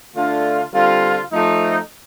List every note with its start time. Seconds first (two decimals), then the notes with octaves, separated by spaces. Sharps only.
0.16 D3 A3 D4 F4
0.73 D3 G3 C4 F4
1.32 F3 A3 D#4